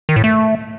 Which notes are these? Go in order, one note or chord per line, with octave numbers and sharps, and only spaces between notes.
D#3
A2
A3